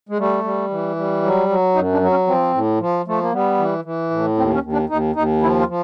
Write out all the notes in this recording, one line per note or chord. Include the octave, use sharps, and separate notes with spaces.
G#3
G3 A3
G3
E3
G3
F#3
F#3
F#2 D#4
D4
F#3
C#4
F3 C4
A2
F3
F3 A3
A#3
G3 B3
E3
E3
A2
D#2 C4
C#4
D#2
D4
D#2 D#4
D#2 D#4
F3 E4
F4
F3